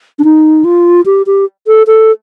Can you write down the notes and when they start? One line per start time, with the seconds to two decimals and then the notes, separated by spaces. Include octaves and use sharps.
0.19 D4
0.24 D#4
0.64 F4
1.06 G4
1.26 G4
1.67 A4
1.87 A4